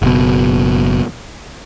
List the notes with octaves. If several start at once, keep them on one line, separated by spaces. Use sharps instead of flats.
F#1 B2